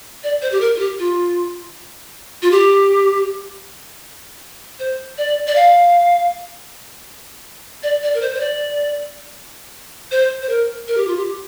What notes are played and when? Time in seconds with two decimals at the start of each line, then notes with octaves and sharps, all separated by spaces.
0.24 D5
0.42 C5
0.52 G4
0.61 A#4
0.76 F4
0.80 G4
0.99 F4
2.42 F4
2.52 G4
4.79 C5
5.18 D5
5.47 D5
5.56 F5
7.83 D5
8.03 D5
8.14 A#4
8.21 C5
8.34 C5
8.40 D5
10.11 C5
10.42 C5
10.49 A#4
10.88 A#4
10.98 G4
11.08 F4
11.17 G4